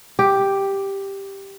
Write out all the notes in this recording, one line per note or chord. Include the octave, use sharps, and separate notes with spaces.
G4